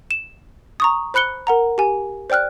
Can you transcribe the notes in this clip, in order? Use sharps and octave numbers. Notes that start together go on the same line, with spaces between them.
E7
A#5 C#6 D#6
C5 B5 F#6 C#7 G7
A#4 F#5 A#5
G4 G#5
C5 D5 G5 F6 F#6